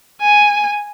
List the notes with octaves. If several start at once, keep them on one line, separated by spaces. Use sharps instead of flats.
G#5